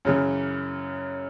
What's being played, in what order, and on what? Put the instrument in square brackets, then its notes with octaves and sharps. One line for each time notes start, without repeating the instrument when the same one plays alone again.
[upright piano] F#2 C#3 E3